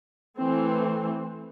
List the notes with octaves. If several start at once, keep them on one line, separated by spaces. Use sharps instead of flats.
E3 A3 C4